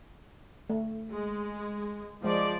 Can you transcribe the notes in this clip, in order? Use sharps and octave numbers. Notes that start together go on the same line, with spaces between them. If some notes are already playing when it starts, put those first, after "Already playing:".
A3
G#3
F3 G#3 D5